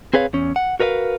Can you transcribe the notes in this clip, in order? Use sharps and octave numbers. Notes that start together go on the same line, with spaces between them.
C4 G#4 B4 C#5 F5
E2 C#4
F#5
F#4 A#4 B4 D#5 F5